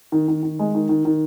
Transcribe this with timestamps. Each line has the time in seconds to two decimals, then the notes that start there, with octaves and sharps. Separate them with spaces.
0.12 D#3
0.28 D#3
0.43 D#3
0.59 G#3
0.75 D#3
0.89 D#3
1.05 D#3